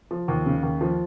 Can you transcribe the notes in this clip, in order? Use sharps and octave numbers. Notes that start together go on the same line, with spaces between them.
F3
D#2
C#3
D#2
F3